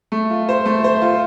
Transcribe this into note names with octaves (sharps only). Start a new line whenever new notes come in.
A3
F4
C5
A3
C5
F4